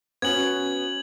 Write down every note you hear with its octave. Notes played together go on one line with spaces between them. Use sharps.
B3 C#4 F#4 G#6 F#7